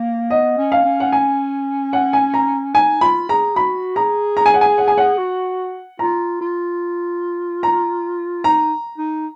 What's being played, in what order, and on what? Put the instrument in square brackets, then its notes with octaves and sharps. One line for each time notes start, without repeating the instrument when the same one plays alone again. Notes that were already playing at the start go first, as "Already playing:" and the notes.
Already playing: [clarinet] A#3
[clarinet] B3 [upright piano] D#5
[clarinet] C#4
[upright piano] F5
[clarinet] C#4
[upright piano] F#5
G#5
F#5
G#5
A#5
[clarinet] D#4 [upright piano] G#5
[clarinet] F4 [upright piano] B5
[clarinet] G#4 [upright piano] A#5
[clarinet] F#4 [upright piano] B5
[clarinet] G#4 [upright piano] A#5
[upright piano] A#5
G#5
F#5
G#5
F#5
G#5
F#5
[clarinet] F#4
[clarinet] F4 [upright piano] A#5
[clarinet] F4
[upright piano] A#5
[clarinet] D#4 [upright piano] A#5
[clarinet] D#4